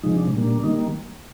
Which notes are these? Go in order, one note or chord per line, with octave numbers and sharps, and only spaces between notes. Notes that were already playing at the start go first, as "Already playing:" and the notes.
C3 F3 G#3 D#4
D4
A#2 G3 A#3
D4
D#3 G3 A#3 D#4